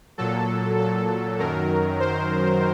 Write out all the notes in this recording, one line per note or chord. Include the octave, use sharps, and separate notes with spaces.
A#2 F#3 A4
A4
F#2 D#3 F#3 A#4
C5